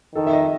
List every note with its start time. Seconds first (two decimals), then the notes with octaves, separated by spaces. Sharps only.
0.15 D#3 A4
0.27 E5
0.33 D#5